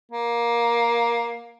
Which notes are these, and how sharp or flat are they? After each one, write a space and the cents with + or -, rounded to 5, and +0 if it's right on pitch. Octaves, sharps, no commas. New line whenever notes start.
A#3 +15